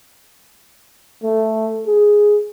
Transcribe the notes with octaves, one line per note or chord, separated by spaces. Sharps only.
A3
G#4